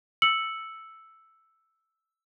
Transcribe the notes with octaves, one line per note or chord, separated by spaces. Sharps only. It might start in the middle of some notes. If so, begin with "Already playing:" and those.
E6 C#7 F#7